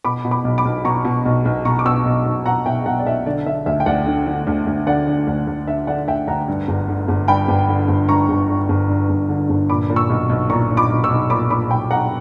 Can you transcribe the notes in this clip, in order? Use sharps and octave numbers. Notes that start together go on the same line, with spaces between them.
B2 B5 D6
B2
B5 D6
B1
B5 D6
B1
B2 A#5 C#6
B2
B1
B1
B2 A#5 C#6
D6
B2 C#6 E6
B1
B1
B2 F#5 A#5
B2 E5 G5
B1 F#5 A#5
D5
B1 E5
D3 D5
D3 E5
D2 E5
G5
D2 D5 F#5
D3
D3
D2
D2
D3 D5 F#5
D3
D2
D2
D3 E5
D3 D5 F#5
D2 E5 G5
D2 F#5 A#5
G2
G1
D3
G1
G2 G5 B5
G1
D3
G1
G2 A#5 C#6
G1
D3
G1
G2
G1
D3
G1
A#2 B5 D6
A#2
C#6 E6
B1
B1
A#2 A#5 C#6
A#2
B5 D6
B1
C#6 E6
B1
A#2 B5 D6
A#2 B5 D6
B1 G5 B5
B1 F#5 A#5